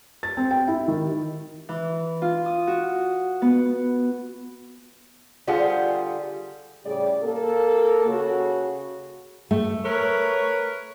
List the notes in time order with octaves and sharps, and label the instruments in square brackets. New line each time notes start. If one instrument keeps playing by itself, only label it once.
[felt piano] A6
C4
G5
E4
D#3
[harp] E3
F4
D#6
F#4
B3
[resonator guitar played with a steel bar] D3 G3 F4 G#4 C5 F#5
[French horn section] A2 C#3 G3 G4 G#4 D5
A#3 A4
C#3 F#4
[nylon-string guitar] A3
[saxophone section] A#4 B4 C#5